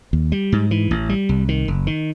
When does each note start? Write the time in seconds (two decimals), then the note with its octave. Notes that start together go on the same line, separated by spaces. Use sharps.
0.13 D#2
0.32 G3
0.52 G#2
0.71 E3
0.91 A1
1.09 G3
1.29 C2
1.49 D#3
1.68 F#1
1.87 D#3